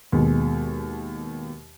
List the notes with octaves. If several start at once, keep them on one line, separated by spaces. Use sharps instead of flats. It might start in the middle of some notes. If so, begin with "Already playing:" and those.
D#2 B2 G#3